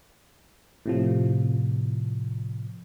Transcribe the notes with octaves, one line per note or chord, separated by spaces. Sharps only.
A2 C3 F3